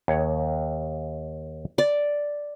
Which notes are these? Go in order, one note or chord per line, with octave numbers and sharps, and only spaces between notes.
D#2 C#5
D5